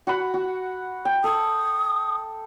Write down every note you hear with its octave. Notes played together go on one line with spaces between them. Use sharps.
F#4 F#5 B5
F#4
G5
A4 D#6